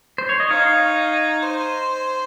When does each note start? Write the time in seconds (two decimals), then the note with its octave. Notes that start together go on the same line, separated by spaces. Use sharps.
0.18 C5
0.29 C#5
0.40 D#5
0.49 D#4 C#5 F5
1.42 C5